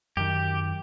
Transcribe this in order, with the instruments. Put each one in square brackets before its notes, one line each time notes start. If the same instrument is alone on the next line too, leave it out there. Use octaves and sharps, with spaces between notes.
[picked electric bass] F#2 D#3 [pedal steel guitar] G4